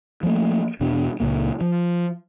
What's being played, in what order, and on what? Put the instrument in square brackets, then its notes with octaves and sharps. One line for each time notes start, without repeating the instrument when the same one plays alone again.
[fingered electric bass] F3 G3 A3 A#3
E1 E2 B2 D4
C#2 G2 A#2 A#3
F3